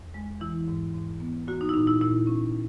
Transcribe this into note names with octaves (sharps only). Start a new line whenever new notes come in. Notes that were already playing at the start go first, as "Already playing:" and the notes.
Already playing: E2
G#3
E3 E4
G#2
G#2
B3
A#3 F#4
D#4
E4
A#2 D#4
E4
A#2 E4
C#4